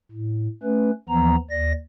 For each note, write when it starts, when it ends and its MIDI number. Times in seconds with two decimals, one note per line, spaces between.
0.12 0.48 45
0.63 0.91 57
0.63 0.91 61
0.63 0.91 71
1.09 1.36 39
1.09 1.36 52
1.09 1.36 53
1.09 1.36 59
1.09 1.36 82
1.50 1.72 39
1.50 1.72 74
1.50 1.72 94